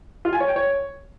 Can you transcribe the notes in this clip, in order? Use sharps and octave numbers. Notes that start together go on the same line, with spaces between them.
F4
G#5
C#5
G5
C#5